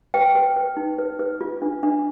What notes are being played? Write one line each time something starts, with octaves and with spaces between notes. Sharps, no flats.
B4 G5
B4
B4
D#4
B4
B4
F4
D4
D4